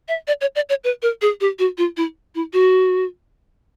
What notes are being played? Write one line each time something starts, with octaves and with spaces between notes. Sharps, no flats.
E5
D5
C#5
D5
C#5
B4
A#4
G#4
G4
F#4
F4
E4
E4
F#4